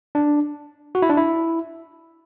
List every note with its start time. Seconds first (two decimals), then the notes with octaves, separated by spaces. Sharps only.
0.15 D4
0.95 F#4
1.02 E4
1.09 D4
1.17 E4